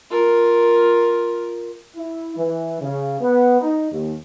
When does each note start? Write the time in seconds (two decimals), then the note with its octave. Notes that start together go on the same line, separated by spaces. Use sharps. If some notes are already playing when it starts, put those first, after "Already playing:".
0.10 F4 A#4
1.95 E4
2.36 E3
2.79 C#3
3.21 B3
3.60 D#4
3.91 D#2